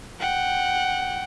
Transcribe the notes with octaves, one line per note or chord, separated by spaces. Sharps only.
F#5 G5